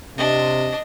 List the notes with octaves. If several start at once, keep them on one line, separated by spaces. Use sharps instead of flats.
C3 D4 D#5